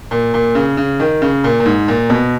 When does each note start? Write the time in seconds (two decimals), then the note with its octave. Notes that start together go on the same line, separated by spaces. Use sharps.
0.11 A#2
0.34 A#2
0.55 C#3
0.77 C#3
1.00 D#3
1.22 C#3
1.44 A#2
1.60 A#2
1.65 G#2
1.88 A#2
2.10 B2